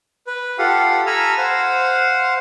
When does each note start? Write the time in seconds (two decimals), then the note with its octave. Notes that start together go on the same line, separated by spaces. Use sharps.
0.27 B4
0.58 F4 G4 A4 F5 F#5
1.07 A4 G#5 A#5 B5 E6 F6
1.38 C5 F5 F#5